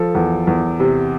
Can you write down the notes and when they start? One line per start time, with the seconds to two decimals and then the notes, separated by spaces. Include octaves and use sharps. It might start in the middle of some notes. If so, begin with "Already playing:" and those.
Already playing: F3 A4
0.15 E2
0.47 E2
0.80 C3